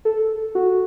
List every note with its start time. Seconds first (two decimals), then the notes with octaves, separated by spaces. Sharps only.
0.05 A4
0.55 F#4